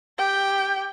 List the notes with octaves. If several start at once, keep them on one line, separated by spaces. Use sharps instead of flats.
G4 G5